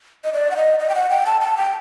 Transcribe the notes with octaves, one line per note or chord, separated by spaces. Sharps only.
D#5
D5
F#5
D#5
D#5
G5
F#5
G5
A5
A5
G5